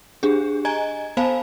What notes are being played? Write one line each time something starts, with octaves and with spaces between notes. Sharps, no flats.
D4 G4 G#4
D#5 G#5 A#5 G#6
B3 C5 F5 G#5 A5 B5